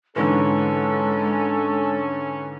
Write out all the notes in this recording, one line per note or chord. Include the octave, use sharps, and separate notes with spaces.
G#2 D3 E3 G#3 C#4 A4